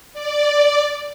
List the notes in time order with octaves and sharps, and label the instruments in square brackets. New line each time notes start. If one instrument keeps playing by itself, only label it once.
[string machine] D5